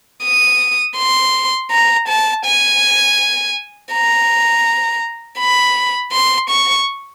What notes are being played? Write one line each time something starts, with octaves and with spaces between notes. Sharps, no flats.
D#6
C6
A#5
A5
G#5
A#5
B5
C6
C#6